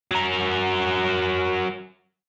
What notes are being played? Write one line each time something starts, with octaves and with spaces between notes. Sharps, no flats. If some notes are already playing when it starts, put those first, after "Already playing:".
F#3 A#4